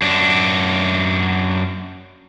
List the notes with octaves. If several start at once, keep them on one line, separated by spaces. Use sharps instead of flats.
F#2 D4